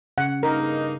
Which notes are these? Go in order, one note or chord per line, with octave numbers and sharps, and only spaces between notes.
C#3 F#5
G2 A#3 D#4 A#4